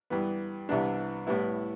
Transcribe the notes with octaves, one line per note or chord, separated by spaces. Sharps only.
G2 E3 B3
C2 C3 E3 B3 D4
A2 G3 B3 E4